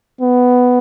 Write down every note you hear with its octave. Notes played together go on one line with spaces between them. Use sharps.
B3